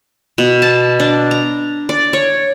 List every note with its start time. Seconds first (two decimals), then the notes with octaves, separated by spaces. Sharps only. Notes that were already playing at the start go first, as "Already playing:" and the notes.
0.38 B2
0.62 A5
1.00 D4
1.31 A#5
1.89 D5
2.13 C#5